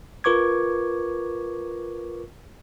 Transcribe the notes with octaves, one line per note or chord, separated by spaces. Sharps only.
F4 A#4 B4 C#6 D6 G#6